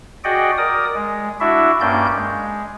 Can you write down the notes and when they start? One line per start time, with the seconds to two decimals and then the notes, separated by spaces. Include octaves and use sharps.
0.24 F#4 G#4 D5 D#5 F#5 G5
0.58 A#4 D5 D#6
0.95 G#3
1.40 D4 E4 F#4 E5
1.81 G2 A#3 C#4 D5 G6
2.16 G#3